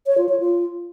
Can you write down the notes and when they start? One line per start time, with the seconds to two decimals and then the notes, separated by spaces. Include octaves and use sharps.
0.07 C#5
0.18 F4
0.29 C#5
0.40 F4